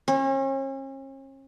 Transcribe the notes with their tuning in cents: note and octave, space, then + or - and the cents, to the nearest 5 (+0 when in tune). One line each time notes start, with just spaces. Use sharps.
C#4 -40